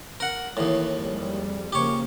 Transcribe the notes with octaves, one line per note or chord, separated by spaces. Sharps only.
A#4 F#5
D#2 A2 E3
F2 G3 G#3
C#3 F3 A#3 G4 C#5